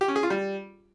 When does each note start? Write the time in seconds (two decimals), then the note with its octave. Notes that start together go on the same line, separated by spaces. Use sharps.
0.01 G4
0.08 C#4
0.16 G#4
0.23 F4
0.30 G3